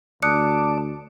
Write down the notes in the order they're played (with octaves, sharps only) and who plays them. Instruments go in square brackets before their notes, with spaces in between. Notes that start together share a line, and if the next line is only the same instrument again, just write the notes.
[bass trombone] D2 [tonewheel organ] D5 D6 [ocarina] A5 [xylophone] D#6 F#6 C#7